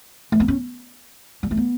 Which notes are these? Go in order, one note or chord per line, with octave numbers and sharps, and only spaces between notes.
A3
B3
C#4
G3
A3
B3